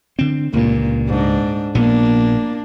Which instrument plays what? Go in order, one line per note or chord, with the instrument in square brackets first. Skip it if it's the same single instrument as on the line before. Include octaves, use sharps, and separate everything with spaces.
[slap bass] D3 C4
[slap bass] C#2 G2 [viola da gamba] A#2
[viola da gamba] G#2 D4
[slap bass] A#1 A#2 B3 [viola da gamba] A#3 D4